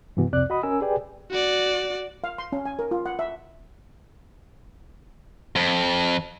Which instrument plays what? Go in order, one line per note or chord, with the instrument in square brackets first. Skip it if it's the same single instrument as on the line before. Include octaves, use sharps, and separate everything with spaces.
[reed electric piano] G2 C3 E3 B3 F#4
C2 F2 C3 C4 D5 F#6
F#4 D#5 B5 D#6
C#4 A#4 G#5 E6
G4 G#4 B4 D5 G5 G#5
[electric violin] F#4 D5
[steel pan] F5
C6
C#4
G#5
A#4
F4
F#5
E5
[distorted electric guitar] F2